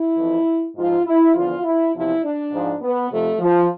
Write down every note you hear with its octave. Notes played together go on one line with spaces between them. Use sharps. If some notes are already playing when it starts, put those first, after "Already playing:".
Already playing: E4
F2 E3
G#2 F3 F4
E4
E2 D3 F3 F4
E4
E2 C3 F3 E4
D4
G#2 F3
B3
F2 C3 F3 A3
F3